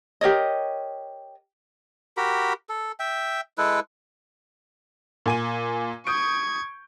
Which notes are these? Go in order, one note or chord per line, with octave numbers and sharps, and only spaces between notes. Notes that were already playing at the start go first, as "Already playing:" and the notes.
G4 A#4 C#5 D#5
F#4 G4 A#4 B5
A4
E5 G5
G#3 E4 A4 B4
A#2 G#5 D#7
C#6 D#6 G6 G#6 D7